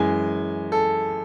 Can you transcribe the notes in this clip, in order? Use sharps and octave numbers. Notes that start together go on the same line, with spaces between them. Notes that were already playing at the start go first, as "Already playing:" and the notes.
Already playing: F#2 E3 G#3 G#5
A4